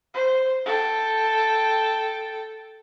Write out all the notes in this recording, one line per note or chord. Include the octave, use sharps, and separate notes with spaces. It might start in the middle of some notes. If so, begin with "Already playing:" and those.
C5
A4 G5